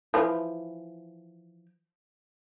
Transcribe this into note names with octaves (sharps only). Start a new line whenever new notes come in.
E3 F3